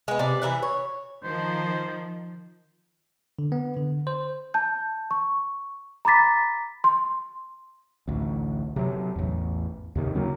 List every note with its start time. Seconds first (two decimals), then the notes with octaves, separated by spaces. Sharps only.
0.08 G#3 B3
0.19 C3 D5
0.42 E3 G3 E5 F#5
0.63 C#5
1.24 D#3 F3 C5
3.39 D3
3.52 B3
3.76 D3
4.07 C5
4.54 A5 G6
5.11 C#6
6.05 A#5 B5 D6 A6 B6
6.84 C6
8.08 A1 D2
8.76 C3 F#3
9.16 A1 E2
9.95 D#2 C3 D#3
10.15 C#3 F#3 A#3